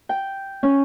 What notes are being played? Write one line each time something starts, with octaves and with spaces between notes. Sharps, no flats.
G5
C#4